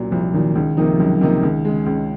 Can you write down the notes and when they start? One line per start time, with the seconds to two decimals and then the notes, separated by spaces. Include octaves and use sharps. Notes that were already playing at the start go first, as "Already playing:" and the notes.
Already playing: C2 A#2 F#3
0.11 C2 F3
0.34 A#2 D#3 F#3
0.55 C#2 D#3
0.77 C3 D#3 F3 A#3 D#4
0.93 F3
0.99 C#2 F#3
1.21 C3 D#3 F3 A#3 D#4
1.43 C#2 D#3
1.65 C#3 G#3
1.86 C#2